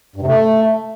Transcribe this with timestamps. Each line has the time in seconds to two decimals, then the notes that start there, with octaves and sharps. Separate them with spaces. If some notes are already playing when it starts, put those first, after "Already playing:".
0.16 G2
0.22 C3
0.27 A3